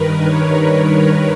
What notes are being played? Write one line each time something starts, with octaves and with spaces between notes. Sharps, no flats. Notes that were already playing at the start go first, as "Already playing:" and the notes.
Already playing: G2 D#3 A#4 B4
C#5
C#5